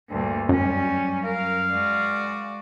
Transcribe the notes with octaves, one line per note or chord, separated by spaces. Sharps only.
D2 G2 A#2
F#2 G3 C#4
A#4 F5
G#3 F#4 D5